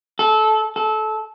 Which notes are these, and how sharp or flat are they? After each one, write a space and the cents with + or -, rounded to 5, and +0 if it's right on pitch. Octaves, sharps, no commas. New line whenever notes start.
A4 -20
A4 -20